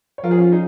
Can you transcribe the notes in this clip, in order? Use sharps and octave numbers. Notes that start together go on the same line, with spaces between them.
C#5
F3 F4 A#4
G#4
C#4 F4
D#4 G#4